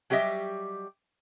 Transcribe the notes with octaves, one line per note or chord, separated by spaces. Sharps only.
F#3 G3 G4 C#5 D#5 E5